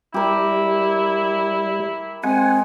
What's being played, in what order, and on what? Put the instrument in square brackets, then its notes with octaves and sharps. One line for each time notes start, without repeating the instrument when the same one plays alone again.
[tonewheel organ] G3 [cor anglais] E4 [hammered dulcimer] G4 A#4
[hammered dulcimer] G#3 [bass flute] C4 [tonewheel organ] F#5 G#5